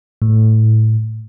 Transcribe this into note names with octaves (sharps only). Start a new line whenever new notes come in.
A2